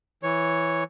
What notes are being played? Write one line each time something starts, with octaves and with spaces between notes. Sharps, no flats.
E3 C#5